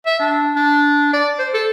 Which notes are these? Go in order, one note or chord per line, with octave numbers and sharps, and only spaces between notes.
E5
D4
D4
D5
C5
A4